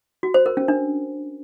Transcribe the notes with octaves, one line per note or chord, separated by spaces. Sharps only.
F#4
C5
A#4
C#4
D4